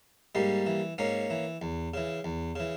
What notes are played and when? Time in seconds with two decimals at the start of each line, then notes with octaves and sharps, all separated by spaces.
0.35 G#2 G3 A#3
0.66 E3
0.98 G#2 A#3 C#4
1.30 E3
1.62 E2
1.94 C#3 E3
2.24 E2
2.56 C#3 E3